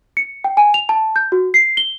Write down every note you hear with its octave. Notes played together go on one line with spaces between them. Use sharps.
C#7
G5
G#5
F7
A5
G6
F#4
C7
G7